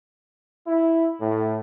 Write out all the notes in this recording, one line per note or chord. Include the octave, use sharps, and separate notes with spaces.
E4
A2